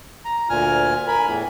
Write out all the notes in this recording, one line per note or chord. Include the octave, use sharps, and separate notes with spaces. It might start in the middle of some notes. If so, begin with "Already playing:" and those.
A#5
D2 A#2 G#5 F6
A#4 G#5 B5
E2 A2 E3